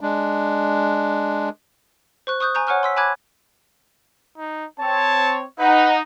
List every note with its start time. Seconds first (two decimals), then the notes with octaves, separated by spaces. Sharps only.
0.01 G#3 D4
2.27 C5 C#6 F#6
2.40 C#6 D#6 F#6 G6
2.55 G#5 A#5 C#6 G6
2.67 C#5 F#5 G#5 C#6 F6 F#6
2.83 C6 E6 B6
2.96 G#5 A5 B5 D6 F#6 G#6
4.38 D#4
4.80 C4 C#5 A5
5.59 D#4 B4 F#5